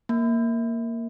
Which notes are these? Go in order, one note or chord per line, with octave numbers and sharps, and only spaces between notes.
A#3